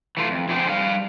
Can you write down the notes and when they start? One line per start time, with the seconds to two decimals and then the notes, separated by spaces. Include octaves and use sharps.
0.17 E3 A3 F4
0.30 F2
0.48 F2 D3 A3 G#4 C5 G5
0.69 G3 F5